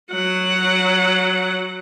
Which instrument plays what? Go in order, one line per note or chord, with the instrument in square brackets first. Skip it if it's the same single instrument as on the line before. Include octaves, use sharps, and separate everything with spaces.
[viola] F#3 F#5